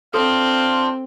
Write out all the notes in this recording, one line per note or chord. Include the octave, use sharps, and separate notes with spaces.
C4 D4 F4 A4 C5 F5